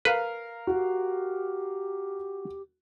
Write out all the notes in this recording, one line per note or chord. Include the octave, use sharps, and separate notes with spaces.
A#4 B4 F5
F#4 G4